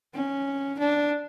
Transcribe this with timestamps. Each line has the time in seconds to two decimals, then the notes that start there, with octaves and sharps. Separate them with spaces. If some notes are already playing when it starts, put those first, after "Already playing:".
0.14 C#4
0.79 D4